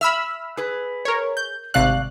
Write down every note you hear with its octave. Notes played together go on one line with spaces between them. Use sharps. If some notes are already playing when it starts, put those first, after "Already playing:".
E5 B5 E6 F6
G#4 B4
A#4 C#5
G6
G#1 C3 A3 D5 F5 F#6